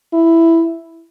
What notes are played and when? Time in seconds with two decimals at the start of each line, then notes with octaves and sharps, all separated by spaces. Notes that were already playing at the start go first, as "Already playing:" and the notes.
0.14 E4